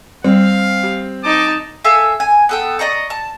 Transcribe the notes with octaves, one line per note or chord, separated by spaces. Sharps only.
G3 C4 F5
G4
D#4 A5 D6
A4 E5 F5 G#5
G#5
B3 A4 G5
D5 D#5 A#5 C#6
A5